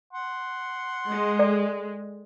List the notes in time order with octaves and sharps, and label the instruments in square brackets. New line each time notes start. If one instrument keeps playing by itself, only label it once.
[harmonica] F#5 C6
[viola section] G#3
[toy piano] A4 D5 G5